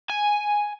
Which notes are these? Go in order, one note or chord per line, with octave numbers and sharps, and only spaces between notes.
G#5